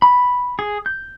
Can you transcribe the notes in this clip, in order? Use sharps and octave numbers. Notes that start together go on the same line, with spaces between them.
B5
G#4
G6